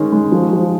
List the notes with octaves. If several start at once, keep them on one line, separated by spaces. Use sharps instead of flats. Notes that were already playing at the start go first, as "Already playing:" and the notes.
Already playing: D#3 G#3 C#4
G#3
F3
F3